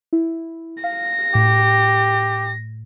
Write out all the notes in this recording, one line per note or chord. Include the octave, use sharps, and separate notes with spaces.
E4
F5 A#6
A2 G4